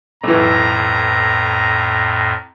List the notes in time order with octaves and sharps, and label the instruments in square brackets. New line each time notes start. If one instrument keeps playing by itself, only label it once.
[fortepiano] B1 E3 [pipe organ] F2 A2 [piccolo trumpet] A#5